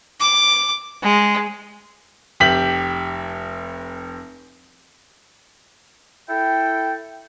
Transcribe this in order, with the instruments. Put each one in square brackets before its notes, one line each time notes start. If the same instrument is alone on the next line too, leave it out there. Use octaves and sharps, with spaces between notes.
[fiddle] D6
G#3
[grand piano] F1 G4 B6 F#7
[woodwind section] E4 A4 G5